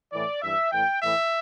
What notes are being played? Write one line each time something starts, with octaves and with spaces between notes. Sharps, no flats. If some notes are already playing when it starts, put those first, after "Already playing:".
A2 E3 D5
G2 E3 E5
A2 E3 G5
A2 E3 E5